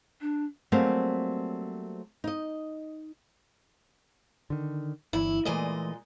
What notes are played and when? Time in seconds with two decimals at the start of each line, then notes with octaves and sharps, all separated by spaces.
0.21 D4
0.72 F#3 G3 A3 A#3 C4 G#4
2.24 D#4 D#5
4.50 D3 D#3
5.13 G1 E3 E4
5.45 A#2 E3 G#3 A3 D#5